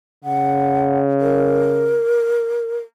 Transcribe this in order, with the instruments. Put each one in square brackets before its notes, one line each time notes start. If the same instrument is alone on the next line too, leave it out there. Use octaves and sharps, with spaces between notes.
[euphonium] C#3 [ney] F#5
[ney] A#4